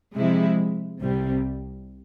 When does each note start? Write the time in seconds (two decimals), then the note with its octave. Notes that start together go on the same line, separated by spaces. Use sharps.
0.17 C3 F3 G#3 E4
1.01 C2 C3 G3